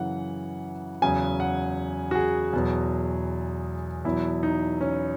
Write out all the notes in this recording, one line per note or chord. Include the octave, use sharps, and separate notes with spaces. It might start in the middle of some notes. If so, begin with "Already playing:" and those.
Already playing: F#2 C#3 E3 F#5
E2 C#3 F#3 G#5
F#5
F#4
G#4
E2 B2 F#3
E2 B2 F#3 E4
D#4
C#4